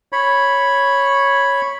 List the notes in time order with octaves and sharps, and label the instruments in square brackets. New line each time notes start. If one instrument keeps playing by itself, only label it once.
[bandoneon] C#5 B5